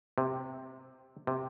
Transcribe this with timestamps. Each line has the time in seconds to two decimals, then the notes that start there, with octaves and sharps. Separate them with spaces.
0.18 C3
1.27 C3